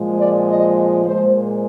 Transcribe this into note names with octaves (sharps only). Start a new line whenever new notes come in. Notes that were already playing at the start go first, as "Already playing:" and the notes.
Already playing: A#2 F3 G#3
D5
D#5
A#2 G#3 C5